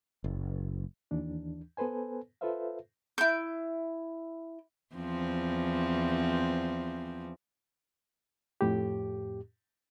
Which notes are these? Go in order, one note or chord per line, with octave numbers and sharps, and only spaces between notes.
F#1
D#2 E3 D4
B3 A4 B4 C5 G#5
F4 A4 B4 C5 E5 F5
E4 G6
E2 F3 C4
F2 A2 G4